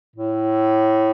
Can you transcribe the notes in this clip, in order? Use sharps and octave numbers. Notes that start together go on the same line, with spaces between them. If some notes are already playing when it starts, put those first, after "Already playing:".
A2